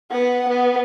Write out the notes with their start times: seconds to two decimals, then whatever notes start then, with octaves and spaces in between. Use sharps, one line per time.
0.11 B3 F#5
0.49 B3